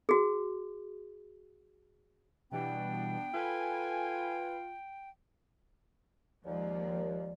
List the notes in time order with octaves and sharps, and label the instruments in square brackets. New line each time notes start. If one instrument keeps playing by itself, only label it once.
[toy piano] F#4 G#4
[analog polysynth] B2 E3 G3 [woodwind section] B3 D4 [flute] G5
[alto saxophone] F4 [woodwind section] A4 G#5 [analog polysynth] B4
[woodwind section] D#2 [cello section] F3 G#3 A#3 [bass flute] D5